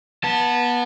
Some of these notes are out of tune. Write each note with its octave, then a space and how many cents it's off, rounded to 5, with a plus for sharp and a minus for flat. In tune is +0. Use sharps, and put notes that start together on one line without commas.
B3 -25 A5 +5